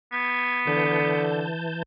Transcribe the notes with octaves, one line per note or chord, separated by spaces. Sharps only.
B3 G#6
D3 E3 A5 G6